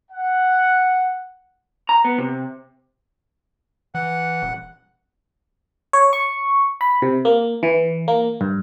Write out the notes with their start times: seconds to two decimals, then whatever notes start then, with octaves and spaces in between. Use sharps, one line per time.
0.11 F#5
1.89 A#5
2.05 B3
2.18 C3
3.95 E3 F#5
4.43 D#1
5.93 C#5
6.13 C#6
6.81 B5
7.02 C3
7.25 A#3
7.63 E3
8.08 A#3
8.41 G2